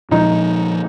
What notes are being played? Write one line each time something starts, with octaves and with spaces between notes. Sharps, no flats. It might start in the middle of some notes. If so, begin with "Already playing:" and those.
A#2 F3 G#3 D#4